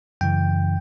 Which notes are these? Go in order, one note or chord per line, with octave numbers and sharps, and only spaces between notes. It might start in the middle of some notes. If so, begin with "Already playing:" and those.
F#2 C#3 E3 G5